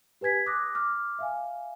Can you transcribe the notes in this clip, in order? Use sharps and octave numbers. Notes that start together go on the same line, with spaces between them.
G4 B4 G#5 G#6 B6
D6 D#6 F#6 A#6
D6 F6
E5 F5 G#5